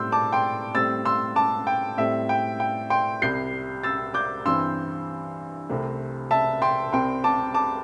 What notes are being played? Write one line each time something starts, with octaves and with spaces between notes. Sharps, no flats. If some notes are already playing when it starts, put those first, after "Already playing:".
Already playing: A2 G3 C4 C6 E6 G6
A5 D6
G5 C6
A2 G3 C4 E6 A6
C6 E6
A5 D6
G5
A2 G3 C4 E5
G5
G5
G5 C6
C2 C3 G3 G6 C7
E6 A6
D6 G6
G2 E3 C4 C6 E6
C2 C3 A3 C4
E5 A5
G5 C6
C2 C3 G3 C4 G5 C6
A5 D6
A5 D6